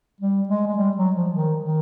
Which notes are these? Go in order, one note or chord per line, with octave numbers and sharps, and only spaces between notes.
G3
G#3
G#3
G3
F#3
F3
D#3
D#3